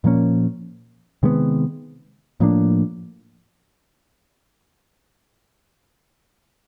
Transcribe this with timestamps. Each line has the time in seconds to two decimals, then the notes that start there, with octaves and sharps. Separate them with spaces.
0.04 A#2 F3 A#3 C#4
1.23 C3 D#3 G#3 B3
2.40 A2 F3 A#3 D4